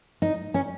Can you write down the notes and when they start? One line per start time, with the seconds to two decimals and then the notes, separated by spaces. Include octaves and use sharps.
0.22 D#4
0.54 C#4